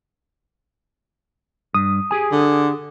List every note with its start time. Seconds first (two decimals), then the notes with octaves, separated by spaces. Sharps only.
1.74 G2 D#6
2.11 G4 G#4 G#5
2.32 D3